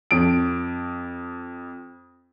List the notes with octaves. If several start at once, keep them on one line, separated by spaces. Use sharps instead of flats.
F2 D7